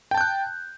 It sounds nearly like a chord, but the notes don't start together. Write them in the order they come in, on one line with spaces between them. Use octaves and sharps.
G5 A5 G6 F#6